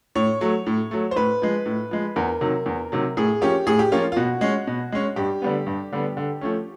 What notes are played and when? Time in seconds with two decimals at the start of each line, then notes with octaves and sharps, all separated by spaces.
0.15 A2 C#5
0.41 F#3 A3
0.67 A2
0.91 F#3 A3
1.11 C5
1.16 A2 B4
1.42 F3 G#3
1.66 A2
1.91 F3 G#3
2.16 E2 A#4
2.41 C3 D#3 F#3
2.66 E2
2.92 C3 D#3 F#3
3.17 A2 G#4
3.41 F3 A#3 C#4 G4
3.67 A2 G#4
3.79 G4
3.92 F3 A#3 C#4 F4
4.12 F4
4.16 B2 F#4
4.41 G#3 C#4
4.67 B2
4.92 G#3 C#4
5.16 G2 G4
5.42 D3 G3 B3
5.67 G2
5.93 D3 G3 B3
6.17 D3
6.41 F3 A3 C#4